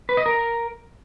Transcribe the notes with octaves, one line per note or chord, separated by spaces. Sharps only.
B4
D#5
A#4